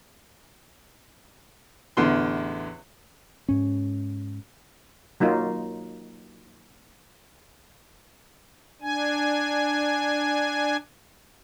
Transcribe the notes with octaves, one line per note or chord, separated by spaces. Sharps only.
A1 E2 D3 C6
G#2 C#4
F#3 A#3 D#4 F4
D4 G#5